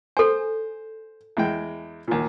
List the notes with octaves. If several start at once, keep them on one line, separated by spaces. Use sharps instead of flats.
A4 C5 G#5
E2 G#3 G5
D#2 A#2